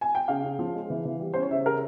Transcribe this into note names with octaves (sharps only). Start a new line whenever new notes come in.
G#5
G5
C#3 F5
C#3
F3
G#3
E3
E3
G3
C#4 C5
C#5
C#3 E5
C#3 A#4